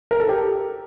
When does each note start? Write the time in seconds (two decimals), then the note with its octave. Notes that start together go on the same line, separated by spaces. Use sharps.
0.11 A#4
0.20 A4
0.29 G4